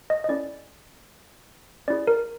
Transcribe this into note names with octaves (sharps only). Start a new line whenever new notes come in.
D#5
D#5
C#4 E4 A4 D5
C#4 E4 G#4 D5
A#4